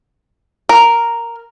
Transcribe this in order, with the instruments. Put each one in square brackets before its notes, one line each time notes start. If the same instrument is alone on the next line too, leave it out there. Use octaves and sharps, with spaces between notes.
[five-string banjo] A#4